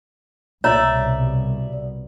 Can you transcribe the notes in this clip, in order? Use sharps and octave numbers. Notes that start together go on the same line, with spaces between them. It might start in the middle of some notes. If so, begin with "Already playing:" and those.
C2 B2 C#5 D5 E5 A#5